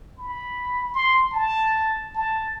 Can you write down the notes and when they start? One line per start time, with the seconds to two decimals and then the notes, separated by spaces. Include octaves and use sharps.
0.18 B5
0.94 C6
1.32 A5
2.15 A5